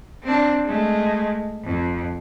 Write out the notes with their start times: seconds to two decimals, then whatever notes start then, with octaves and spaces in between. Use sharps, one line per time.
0.23 C4 D4
0.65 G#3 A3
1.64 F2